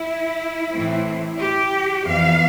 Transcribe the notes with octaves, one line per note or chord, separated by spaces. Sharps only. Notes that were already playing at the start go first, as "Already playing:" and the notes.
Already playing: E4
A2 E3 A3 C4
G4
F2 E3 B3 F5